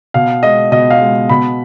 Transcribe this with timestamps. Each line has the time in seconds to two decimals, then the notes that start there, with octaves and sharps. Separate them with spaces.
0.14 B2 F5
0.43 G#3 D#5
0.71 B2 D#5
0.90 F5
1.01 G#3
1.29 B2 B5